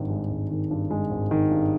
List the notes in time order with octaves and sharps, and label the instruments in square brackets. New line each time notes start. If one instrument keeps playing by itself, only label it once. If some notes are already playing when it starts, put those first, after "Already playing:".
Already playing: [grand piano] G#1 G2 D#3
G#3
G#1
D#3
G2
G#3
G#1
D#3
G2